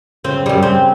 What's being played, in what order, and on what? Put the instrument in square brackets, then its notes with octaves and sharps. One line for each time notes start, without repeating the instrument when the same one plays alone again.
[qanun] C#3 [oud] C4
[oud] F#2 G3
C4